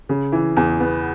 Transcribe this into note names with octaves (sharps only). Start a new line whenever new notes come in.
C#3
E3
E2
B3